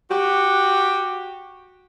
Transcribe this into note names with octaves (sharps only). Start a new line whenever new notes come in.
F#4 G4